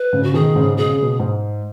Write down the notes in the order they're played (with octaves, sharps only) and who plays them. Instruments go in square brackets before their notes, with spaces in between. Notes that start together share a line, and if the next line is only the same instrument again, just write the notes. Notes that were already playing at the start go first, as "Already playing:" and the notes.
Already playing: [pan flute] B4
[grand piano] G#2 C#3
[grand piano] C#3 [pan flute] F#4
[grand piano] B2 D#3 [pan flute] G#4
[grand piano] G#2 C#3
[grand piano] B2 [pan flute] G#4
[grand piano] C#3
B2
G#2